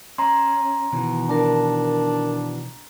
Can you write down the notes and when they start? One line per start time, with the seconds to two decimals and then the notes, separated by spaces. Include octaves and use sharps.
0.18 C#4 A#5 C6
0.92 B2 D#3 E3
1.29 D4 A#4 A5